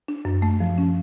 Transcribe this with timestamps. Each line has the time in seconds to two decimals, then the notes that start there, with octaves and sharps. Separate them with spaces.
0.08 D4
0.25 F#2
0.42 A3
0.60 F3
0.78 C#4